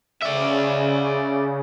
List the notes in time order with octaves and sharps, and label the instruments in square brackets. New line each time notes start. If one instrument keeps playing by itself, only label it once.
[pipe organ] C#3 [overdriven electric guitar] D5 E5